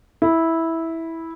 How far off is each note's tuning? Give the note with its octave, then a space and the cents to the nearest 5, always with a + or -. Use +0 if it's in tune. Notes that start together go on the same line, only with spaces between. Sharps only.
E4 -10